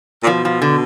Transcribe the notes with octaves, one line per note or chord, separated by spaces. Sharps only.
A#2
B2 F3
F3
D3